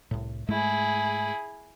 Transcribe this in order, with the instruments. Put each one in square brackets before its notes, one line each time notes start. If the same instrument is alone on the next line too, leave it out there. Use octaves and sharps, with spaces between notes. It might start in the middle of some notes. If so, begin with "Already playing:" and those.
[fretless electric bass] C2 A2
[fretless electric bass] G#2 G#3 A3 [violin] E4 G#4